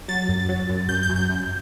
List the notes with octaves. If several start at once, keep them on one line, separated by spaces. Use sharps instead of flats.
F#3 A6
F#2
F#3
F#2
F#2 G6
G6
F#2
G6
F#2